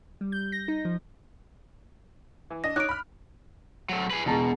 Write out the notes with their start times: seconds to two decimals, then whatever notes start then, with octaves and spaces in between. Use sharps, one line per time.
0.21 G3
0.32 G6
0.52 A#6
0.68 D#4
0.85 F3
2.50 E3
2.64 D4 D#5 A#6
2.76 D#4 C#5 D6 F#6 D7
2.89 B5 F6
3.89 F#3 A3
4.10 G#4 B4
4.26 E1 B2 A5 A#5